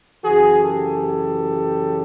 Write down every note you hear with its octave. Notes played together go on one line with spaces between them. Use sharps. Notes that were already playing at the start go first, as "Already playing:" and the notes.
F#2 C#3 E3 F#4 G#4
G4 A4